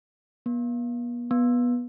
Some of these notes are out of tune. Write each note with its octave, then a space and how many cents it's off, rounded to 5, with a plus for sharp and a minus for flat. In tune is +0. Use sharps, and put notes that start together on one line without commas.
B3 -45
B3 -20